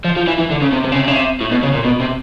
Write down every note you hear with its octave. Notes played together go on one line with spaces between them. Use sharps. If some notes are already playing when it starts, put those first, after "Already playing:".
F3
F3
E3
E3
D3
C#3
C3
C3
C#3
C3
C#3
C3
A2
B2
C#3
A#2
B2
C3